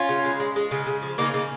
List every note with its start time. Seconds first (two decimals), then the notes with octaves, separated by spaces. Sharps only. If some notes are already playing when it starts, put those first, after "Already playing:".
Already playing: C#4 F4
0.09 C#3
0.24 G#3
0.40 G#3
0.56 G#3
0.71 C#3
0.86 C#3
1.02 F3
1.18 C#3 A#3 D#4
1.34 C#3